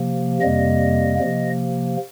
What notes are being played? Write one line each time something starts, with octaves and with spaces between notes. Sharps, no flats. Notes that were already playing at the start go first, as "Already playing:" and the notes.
Already playing: C3 F3 A#3
F2 C3 G3 A#3 D#5
C3 F3 A#3